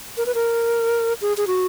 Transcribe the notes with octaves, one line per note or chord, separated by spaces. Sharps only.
A#4
B4
A#4
G#4
G#4
F#4